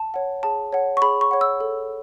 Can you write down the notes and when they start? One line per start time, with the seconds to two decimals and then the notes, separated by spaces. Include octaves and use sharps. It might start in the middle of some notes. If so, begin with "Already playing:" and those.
Already playing: A5
0.14 C#5 F#5
0.43 G#4 A5
0.73 C#5 F#5
0.97 C#6
1.02 G#4 B5
1.21 C#6
1.31 C#5 F#5
1.41 E6
1.60 A4